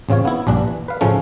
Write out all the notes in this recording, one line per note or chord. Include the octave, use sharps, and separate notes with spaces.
A1 C#3 C4 F4 C#5
B3 E4
A#1 G2 D4
E3
B4 F5
A2 C#3 F3 A3 C#4